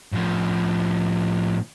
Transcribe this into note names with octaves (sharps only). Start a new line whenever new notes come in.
A2 F3